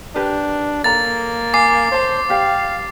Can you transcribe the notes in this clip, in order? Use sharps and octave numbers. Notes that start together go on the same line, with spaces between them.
D4 G4 A#4 B4
A#3 A4 C#5 A#5 A6
G#5 D6 C7
C5 C#5 A5
G4 D5 F5 G5